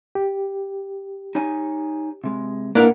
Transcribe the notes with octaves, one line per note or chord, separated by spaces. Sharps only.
G4
D#4 C#5 G#5
C3 G#3
A#2 A#3 D4 E4 A#4 B4 F#5